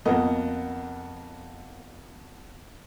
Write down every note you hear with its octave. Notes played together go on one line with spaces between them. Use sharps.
F2 A#3 B3 D#5